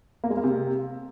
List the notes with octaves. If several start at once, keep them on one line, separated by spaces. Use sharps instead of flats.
A#3
G#3
A#3
C3